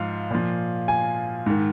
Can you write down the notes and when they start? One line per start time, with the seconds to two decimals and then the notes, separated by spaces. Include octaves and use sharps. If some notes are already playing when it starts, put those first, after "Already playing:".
Already playing: G#2 F3 F5
0.31 A#2 F3
0.88 G#5
1.46 G#2 D#3